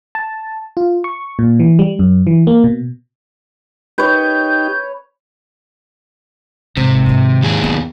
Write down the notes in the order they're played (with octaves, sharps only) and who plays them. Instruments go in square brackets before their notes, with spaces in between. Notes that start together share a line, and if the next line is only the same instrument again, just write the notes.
[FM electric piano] A5
F4
C#6
A#2
E3
G3
F#2
E3
A#3
B2
[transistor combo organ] D#4 G4 [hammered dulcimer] B4 C#5 [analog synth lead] G6
[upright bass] G#1 [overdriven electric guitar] C3
[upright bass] G#2 D#3
[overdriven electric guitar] D#2 G#4
[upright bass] B3